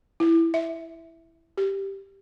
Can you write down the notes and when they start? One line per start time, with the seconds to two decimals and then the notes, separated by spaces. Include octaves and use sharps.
0.20 E4
0.54 E5
1.57 G4